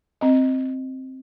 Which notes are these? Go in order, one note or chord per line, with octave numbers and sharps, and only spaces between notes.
C4 D#5